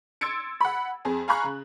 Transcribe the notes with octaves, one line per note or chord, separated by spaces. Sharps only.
C6 E6 G#6 A6 C#7 D7
F#5 B5
F2 G#4
F5 G#5 A#5 B5 C#6 F#6
C#3